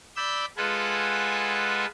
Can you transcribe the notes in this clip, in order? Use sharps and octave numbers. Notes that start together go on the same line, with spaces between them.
D5 B5 E6 G6
G#3 F4 A4 B4 F#5 G#5